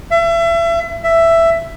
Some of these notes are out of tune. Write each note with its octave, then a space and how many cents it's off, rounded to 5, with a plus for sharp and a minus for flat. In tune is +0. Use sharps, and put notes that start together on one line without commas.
E5 +35
E5 +10